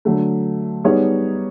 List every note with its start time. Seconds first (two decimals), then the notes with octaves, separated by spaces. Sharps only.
0.05 D3 F#3 A3
0.84 G3 B3 D#4 G#4 C#5